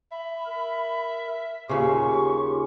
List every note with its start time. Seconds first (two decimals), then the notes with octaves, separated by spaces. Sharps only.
0.12 E5 B5
0.46 A#4
1.69 D#2 C#3 F4 G4 C#6